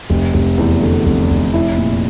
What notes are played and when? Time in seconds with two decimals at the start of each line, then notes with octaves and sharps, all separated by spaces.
0.10 F1
0.34 F1
0.58 E2
0.81 D3
1.06 F1
1.30 F1
1.54 E4
1.77 A#2